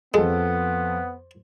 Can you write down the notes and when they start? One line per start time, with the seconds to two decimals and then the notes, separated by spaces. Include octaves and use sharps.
0.14 F2 G#3 B3 A4